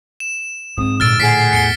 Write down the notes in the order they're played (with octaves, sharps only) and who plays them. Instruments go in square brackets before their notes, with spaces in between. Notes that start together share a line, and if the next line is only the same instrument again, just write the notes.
[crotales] E7
[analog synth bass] G#2 [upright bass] C4 D#4 [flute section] D#6
[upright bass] A#2 D3 [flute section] E6 [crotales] F6 A6 D7
[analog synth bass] A2 [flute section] G#4 F#5 [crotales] B6 C7 D7
[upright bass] E2 [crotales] C#7 D7 G7